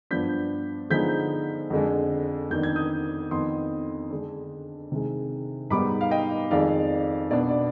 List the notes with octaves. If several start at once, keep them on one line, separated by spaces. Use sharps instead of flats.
G2 F3 B3 D4 G6 B6
D3 F3 G#3 B3 D#4 G6 B6
F2 D3 G#3
F2 D#3 B3 D4 G6
G#6
D#6 G6
F2 D#3 B3 D#4 C6 D#6
D3 G#3 D4
C3 D#3 G#3
G#2 G3 B3 D#4 B5 D6
F5
D#5 G5
F2 D#3 G#3 D5 F5
B2 B3 D4 D5
D5